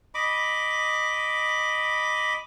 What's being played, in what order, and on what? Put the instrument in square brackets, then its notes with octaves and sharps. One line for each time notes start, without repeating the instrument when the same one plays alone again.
[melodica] D#5 B5 D6